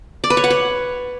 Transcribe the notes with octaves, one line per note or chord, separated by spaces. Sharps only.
D5
B4
C#5
F#5
C#5